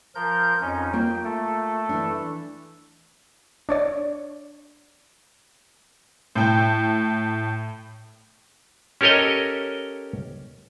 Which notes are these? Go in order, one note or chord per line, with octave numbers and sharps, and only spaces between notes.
F3 A#4 G6
F2 C#4 D#4
A#3 F4 A#4 G5
A3 A4
E3 D4
D4 C#5 D5
A2 G5
C#4 G4 A4 A#4 C#5 D#5